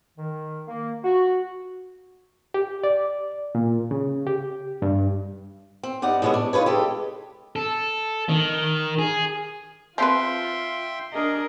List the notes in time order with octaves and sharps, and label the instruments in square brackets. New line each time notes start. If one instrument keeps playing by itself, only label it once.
[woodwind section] D#3
A#3
F#4
[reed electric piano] G4
D5
A#2
C#3
G4
G2
[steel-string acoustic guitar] C4
G2 D#4 D5 F#5
A2 C3 G#3 B3 C#4
D4
D#4 F4 A4 B4 C#5
G#3 G4 A4
[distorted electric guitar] A4
D#3
G#4
[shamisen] F3 C4 B4 [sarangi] F4 [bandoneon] E5 G5 C6
[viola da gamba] D4 G#4 D#5 [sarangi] A#4